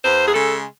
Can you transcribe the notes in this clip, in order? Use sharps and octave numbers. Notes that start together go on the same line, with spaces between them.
E2 C5
G#4
C#3 G#3 A4